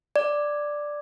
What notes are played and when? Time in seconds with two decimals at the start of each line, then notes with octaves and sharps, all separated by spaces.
0.16 D5